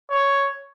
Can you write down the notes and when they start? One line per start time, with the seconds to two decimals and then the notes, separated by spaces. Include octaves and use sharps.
0.10 C#5